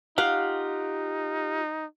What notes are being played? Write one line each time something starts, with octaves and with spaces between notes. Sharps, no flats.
D#4 F4 G4 F5 F#5